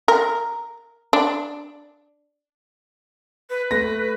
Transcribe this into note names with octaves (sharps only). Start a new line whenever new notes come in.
A#4
D4
B4
A3 B4 A#6